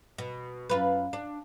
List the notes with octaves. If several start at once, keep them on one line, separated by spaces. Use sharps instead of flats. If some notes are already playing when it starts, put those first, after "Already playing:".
B2
F#2 F4 B4
D4